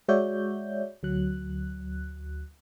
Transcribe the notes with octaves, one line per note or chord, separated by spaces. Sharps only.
G#3 F#4 C#5 D5 E5 G6
D2 F#3 F#6